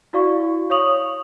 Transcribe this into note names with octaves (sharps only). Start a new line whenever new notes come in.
E4 F#4 D5 F5 C#6
C#5 F5 C#6 D#6 F7 F#7